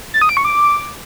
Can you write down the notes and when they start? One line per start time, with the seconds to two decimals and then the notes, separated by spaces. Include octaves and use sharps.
0.14 A6
0.21 D#6
0.29 D7
0.37 C#6
0.45 D6